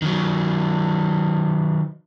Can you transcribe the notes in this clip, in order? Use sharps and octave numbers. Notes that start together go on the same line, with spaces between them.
D#3 F#3